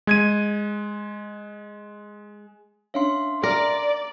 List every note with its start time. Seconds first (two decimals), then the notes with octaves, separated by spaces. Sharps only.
0.07 G#3 G#6 D#7
2.94 C#4 D4 C#5 E5 F5 C6
3.43 A#4 D5